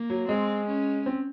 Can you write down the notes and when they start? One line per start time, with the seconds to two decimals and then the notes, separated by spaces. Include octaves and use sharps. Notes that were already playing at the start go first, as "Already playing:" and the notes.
Already playing: A#3
0.10 F#3
0.28 G#3 C4
0.66 C#4
1.06 C4